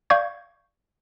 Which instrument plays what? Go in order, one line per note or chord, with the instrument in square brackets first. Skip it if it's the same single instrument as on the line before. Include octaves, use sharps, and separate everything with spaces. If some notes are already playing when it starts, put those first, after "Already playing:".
[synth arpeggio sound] D5 F5 C#6 G6 G#6